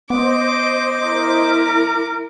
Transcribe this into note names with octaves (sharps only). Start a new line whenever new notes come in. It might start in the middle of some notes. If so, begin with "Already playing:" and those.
B3 C5 D#5 D6
E4 A#4